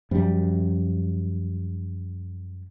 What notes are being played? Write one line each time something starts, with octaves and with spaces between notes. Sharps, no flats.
F#2 F3 G3